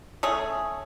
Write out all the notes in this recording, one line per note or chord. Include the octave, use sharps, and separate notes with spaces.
A3 C#4 G#4